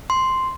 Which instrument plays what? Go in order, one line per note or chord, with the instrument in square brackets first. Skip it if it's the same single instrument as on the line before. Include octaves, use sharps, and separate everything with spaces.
[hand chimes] C6